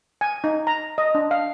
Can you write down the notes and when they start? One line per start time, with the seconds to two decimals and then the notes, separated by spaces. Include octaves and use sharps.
0.21 G#5
0.44 D#4
0.67 A#5
0.98 D#5
1.15 D4
1.31 F5